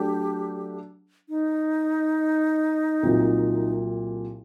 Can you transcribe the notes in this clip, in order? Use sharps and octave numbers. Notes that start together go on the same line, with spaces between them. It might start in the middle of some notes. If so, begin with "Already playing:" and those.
Already playing: F#3 A3 D4 G4
D#4
C2 A#2 F#3